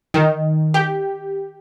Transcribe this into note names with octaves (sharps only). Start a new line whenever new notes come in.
D#3
G4